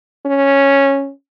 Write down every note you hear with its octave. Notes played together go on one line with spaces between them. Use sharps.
C#4